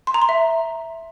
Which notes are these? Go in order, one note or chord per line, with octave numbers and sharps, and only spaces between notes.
C6
A#5
C6
E5